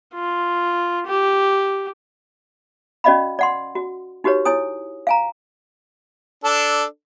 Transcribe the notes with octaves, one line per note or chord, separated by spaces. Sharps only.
F4
G4
C#4 F#4 D5 D#5 F5 B5
D5 F#5 C6
F#4
D#4 F#4 G4 B4 C#5
E4 C#5 G#5 D#6
F5 G#5 A#5
D4 A4